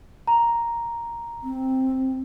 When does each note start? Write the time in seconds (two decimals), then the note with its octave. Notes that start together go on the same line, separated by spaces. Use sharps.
0.27 A#5
1.43 C4